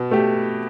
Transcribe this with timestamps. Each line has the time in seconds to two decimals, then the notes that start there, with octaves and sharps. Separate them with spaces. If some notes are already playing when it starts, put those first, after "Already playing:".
Already playing: B2
0.11 A3 G4